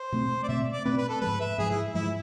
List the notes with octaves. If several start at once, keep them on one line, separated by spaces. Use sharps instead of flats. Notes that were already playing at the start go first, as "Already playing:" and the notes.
Already playing: C5
B2 A3 C4
D5
B2 A3 C4 E5
D5
B2 A3 C4 B4
B4
A4
G#2 F3 G#3 B4
E5
G#2 F3 G#3 G#4
E4
G#2 F3 G#3 E4